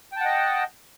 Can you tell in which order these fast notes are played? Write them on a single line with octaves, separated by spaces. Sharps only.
G5 A5 F#5 D#5